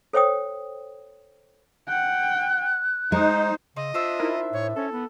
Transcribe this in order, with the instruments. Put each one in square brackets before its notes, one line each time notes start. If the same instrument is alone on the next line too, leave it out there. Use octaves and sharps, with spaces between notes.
[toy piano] A4 C5 C#5 G5 D#6
[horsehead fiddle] F#5 G5 [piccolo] F#6
[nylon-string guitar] G#3 [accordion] D#4 [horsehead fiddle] C5
[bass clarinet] C#3 [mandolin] C4 [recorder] D#5
[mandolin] D4 C5 E5 [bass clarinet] F4
[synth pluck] D#4 E4 A#4
[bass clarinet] A2 [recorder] C#5
[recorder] C#4 [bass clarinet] A4
[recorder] B3